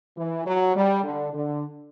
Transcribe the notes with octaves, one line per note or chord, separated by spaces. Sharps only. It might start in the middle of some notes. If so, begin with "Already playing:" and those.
E3
F#3
G3
D3
D3